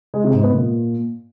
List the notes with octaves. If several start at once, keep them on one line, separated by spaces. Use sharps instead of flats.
G#3
C3
G#2
B3
A#2